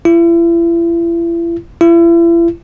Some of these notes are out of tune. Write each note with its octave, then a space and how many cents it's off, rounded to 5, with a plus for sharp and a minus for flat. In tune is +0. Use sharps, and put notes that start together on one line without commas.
E4 +40
E4 +40